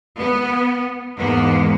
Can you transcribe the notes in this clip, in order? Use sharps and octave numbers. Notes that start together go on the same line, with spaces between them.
B3
E2 G#2 A#3 B3